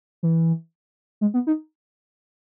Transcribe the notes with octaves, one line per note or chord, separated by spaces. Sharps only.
E3
G#3
B3
D#4